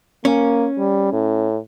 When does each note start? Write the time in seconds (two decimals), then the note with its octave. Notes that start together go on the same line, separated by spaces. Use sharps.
0.25 A#3 C#4
0.78 G3
1.13 A2